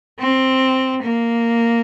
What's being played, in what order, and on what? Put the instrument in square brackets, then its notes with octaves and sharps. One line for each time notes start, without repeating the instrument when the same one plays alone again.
[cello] C4
A#3